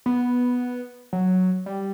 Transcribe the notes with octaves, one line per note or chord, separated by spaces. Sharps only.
B3
F#3
G3